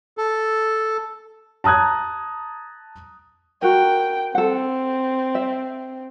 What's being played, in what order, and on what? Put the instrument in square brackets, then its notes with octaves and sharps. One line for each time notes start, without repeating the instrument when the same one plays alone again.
[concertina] A4
[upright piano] A5 A#5 D#6 F#6 G#6
[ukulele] F#4 A#4 [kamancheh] G5
[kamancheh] C4 [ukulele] A4 F#5
[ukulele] E5